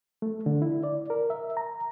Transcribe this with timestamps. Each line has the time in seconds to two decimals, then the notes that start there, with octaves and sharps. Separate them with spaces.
0.22 A3
0.46 D3
0.62 E4
0.83 D5
1.10 A#4
1.30 E5
1.57 A#5